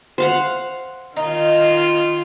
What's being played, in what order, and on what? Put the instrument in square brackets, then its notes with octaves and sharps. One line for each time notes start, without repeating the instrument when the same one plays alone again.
[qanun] C5 F5 F#5
[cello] D#3 F4 [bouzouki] D#4